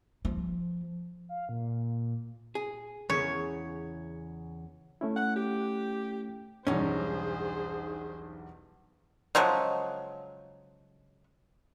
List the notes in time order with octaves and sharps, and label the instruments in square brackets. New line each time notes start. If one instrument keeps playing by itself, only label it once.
[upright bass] F3
[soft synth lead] F5
A#2
[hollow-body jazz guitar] G#4
[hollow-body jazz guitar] E2 C#3 [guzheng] C#5
[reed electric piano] A3 C#4 E4
[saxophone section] F#5
G4
[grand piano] B1 E2 G2 [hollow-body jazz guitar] C#4 D#4 [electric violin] G#4 C5
[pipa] C#3 F3 F#3 G#3